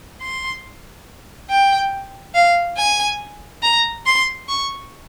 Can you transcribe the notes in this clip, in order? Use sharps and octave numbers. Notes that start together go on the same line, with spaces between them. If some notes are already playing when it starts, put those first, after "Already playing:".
C6
G5
F5
G#5
A#5
C6
C#6